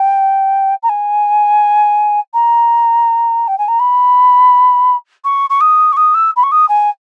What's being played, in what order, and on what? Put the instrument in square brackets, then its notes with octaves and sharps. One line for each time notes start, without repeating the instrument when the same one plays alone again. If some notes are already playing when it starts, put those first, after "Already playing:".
Already playing: [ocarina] G5
A#5
G#5
A#5
G5
G#5
A#5
B5
C#6
C#6
D#6
C#6
D#6
E6
B5
C#6
D#6
G#5